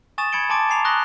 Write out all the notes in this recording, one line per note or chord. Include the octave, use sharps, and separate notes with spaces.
G#5 C#6 D#6 A6 E7
B5 G#6 C#7 D7 G7
G#5 A5 C6 D6 A6 D7
G#5 A#5 C7 F7
C#6 D#6 F#6 A#6 F#7 G7